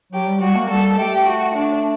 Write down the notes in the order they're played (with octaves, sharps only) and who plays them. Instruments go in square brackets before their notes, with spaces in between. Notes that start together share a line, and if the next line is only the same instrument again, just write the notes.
[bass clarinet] F#3 [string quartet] G4
[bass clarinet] G3
[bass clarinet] G3 [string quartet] F#4
[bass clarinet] A#3
[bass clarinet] G3 [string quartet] A4
[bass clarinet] A3 [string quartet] G4
[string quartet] F#4
D4